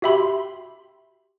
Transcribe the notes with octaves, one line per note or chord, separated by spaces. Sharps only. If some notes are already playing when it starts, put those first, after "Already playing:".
F#4 G4 E5 G5 B5 C6